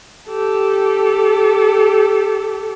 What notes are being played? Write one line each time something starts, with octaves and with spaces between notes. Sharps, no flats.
G4 A4